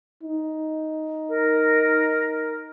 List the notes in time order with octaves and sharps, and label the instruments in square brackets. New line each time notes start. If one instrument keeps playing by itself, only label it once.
[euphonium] D#4
[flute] A#4